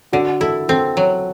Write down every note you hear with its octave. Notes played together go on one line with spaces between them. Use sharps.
D3 F#4
E4 A4
C4 A4
F#3